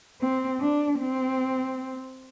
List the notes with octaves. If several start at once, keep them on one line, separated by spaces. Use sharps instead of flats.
C4
D4
C4